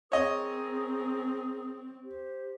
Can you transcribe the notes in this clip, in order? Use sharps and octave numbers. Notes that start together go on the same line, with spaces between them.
C4 G#4 A#4 C#5 D#5 D#6
G4 C5